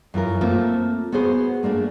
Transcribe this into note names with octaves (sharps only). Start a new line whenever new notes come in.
F#2 E3 F4 A#4
A3 A#3 C4 F4
B3 F#4 G#4 C5
A3 A#3 D4 G#4